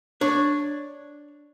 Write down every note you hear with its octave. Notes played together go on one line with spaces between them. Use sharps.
D4 C#5